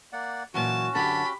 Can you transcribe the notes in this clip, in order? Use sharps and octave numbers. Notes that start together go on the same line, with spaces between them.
A#3 D5 F#5
A#2 E3 F#3 C#4 F#4 A5
F#2 D3 G4 A5 B5